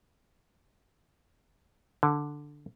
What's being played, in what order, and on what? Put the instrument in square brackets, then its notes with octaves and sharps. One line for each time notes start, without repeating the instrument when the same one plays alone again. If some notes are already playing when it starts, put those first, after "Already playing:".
[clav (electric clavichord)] D3